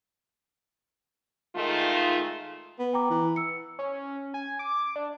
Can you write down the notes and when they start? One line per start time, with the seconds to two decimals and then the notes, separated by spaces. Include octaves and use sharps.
1.56 D#3 G#3 A3 D#4 F4
2.79 B3
2.93 G5 A#5 D6
3.10 E3
3.36 E6 C#7
3.79 C#4
4.34 G#5
4.59 D6
4.96 D4